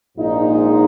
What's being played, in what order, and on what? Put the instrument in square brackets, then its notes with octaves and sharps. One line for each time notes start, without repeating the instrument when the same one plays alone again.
[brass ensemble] A#1 G#2 F3 G#3 D#4